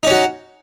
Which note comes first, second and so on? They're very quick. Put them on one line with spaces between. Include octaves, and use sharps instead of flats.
D#4 C#4 F#4